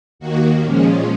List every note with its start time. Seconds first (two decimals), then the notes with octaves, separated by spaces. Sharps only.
0.19 D#2 D#3 A#3 F#4
0.64 A#2 F3 G#3 C#4